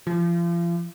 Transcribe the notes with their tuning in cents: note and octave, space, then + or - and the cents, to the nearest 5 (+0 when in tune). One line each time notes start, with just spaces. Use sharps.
F3 -35